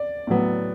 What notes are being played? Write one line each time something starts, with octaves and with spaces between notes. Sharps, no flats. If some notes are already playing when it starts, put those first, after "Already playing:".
Already playing: D5
A2 F#3 B3